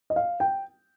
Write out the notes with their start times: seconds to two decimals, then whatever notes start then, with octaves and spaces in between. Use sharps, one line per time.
0.10 D#5
0.16 F5
0.40 G5